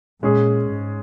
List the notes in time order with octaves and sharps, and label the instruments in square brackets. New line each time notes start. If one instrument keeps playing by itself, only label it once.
[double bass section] A#2 [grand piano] G#3 C#4 G#4
[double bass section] G#2